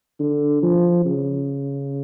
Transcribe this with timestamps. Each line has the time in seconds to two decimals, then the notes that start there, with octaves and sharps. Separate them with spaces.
0.19 D3
0.63 F3
1.05 C#3